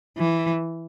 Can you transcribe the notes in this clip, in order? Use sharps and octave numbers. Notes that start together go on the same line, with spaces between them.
E3